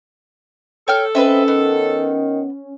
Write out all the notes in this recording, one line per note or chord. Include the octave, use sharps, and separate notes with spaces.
A4 C#5 G5 F6
C4 C#4 B4 D#5 E5
D#3 B3